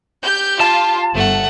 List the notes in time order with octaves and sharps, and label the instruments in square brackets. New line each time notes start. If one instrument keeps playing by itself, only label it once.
[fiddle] G4 [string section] G6
[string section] F4 [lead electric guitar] A5
[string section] G1 [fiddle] A3 F#5